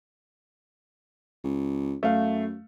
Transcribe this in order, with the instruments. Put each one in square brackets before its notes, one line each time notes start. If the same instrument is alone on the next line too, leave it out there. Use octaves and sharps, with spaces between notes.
[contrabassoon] C#2
[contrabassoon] F#2 [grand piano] A3 F5